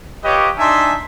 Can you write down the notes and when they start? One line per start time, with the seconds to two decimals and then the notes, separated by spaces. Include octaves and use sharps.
0.24 F4 G4 B4 C#5 D#5 D6
0.58 D4 D#4 E5 G#5 A5 C6